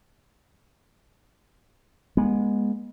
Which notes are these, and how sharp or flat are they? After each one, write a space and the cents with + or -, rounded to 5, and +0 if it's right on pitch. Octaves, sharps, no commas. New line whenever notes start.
G#3 -10 B3 -35